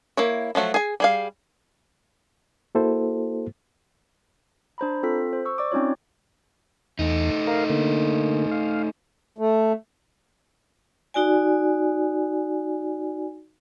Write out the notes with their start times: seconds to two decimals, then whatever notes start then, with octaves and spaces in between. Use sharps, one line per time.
0.17 A#3 E4 C#5
0.55 F3 F#3 A3 F#4
0.74 G#4 G#5
1.00 G3 G#4 F5
2.75 A#3 E4 F#4 A4 C5
4.78 D4 C5 A#5 B5
5.03 C4 F4 A4 B6
5.33 C5
5.45 C#6 E6
5.58 D5 D6
5.72 C4 C#4 D#4 F4 C#5
6.99 E2 A3 D#4
7.47 A#4 F5
7.70 D3 A#3
8.51 F5
9.38 A3
11.14 D#4 F#4 D5 G#5